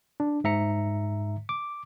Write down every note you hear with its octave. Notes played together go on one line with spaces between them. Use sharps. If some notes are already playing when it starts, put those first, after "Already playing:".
D4
G#2 E5 A#5 C#7
D6